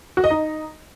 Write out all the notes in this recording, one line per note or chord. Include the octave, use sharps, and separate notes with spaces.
F#4
D#5
D#4